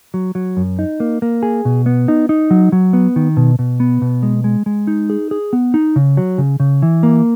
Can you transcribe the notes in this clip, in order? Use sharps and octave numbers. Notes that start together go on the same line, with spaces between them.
F#3
F#3
F#2
D#4
A#3
A#3
G#4
B2
B3
D#4
D#4
F#3
F#3
B3
D#3
B2
B2
B3
B2
G#3
G#3
G#3
D#4
G#4
G#4
B3
D#4
C#3
F#3
C#3
C#3
E3
A#3